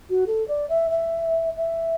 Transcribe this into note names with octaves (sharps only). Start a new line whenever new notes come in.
F#4
A4
D5
E5
E5
E5